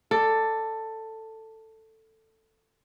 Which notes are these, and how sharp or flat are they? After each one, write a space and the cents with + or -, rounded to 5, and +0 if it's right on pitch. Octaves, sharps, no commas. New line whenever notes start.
A4 +10 D5 +0